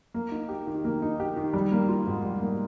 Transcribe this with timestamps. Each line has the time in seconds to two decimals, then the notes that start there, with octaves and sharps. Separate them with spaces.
0.14 A#3
0.31 D#4
0.49 G4
0.67 D#3
0.84 A#3
1.02 D#4
1.20 G4
1.36 D#3
1.53 G3
1.72 A#3
1.88 F4
2.06 G#2
2.23 G3
2.41 A#3